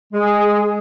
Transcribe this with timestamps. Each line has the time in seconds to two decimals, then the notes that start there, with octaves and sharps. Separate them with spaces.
0.13 G#3 G#4